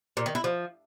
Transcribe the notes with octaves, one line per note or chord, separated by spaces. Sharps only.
A#2
D#3
E4
F3